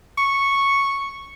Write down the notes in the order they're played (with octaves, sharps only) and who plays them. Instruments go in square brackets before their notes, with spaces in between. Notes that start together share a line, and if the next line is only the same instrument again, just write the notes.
[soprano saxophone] C#6